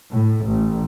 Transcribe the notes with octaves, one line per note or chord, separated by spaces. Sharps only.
A2
A1